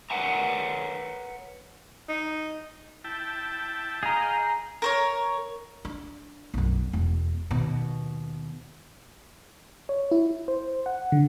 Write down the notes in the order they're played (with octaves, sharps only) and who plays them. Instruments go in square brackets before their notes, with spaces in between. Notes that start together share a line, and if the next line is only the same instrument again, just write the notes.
[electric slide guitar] A#4 B4 C#5 F#5 G#5 A#5
[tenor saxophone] D#4
[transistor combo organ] E4 G5 A5
[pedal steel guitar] G#4 A#5 [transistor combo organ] D#5 F5 G5
[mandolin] A#4 C5 C#5
[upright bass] D4
B1 F#2
E1
D#2 B2
[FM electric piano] C#5
E4
C5
F#5
D3